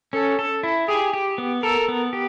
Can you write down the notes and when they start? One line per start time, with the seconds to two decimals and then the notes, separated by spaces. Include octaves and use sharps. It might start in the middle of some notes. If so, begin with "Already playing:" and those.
0.13 C#4 A4
0.39 A4
0.63 E4
0.88 G4 G#4
1.13 G4
1.38 B3
1.63 A4 A#4
1.88 B3
2.13 G4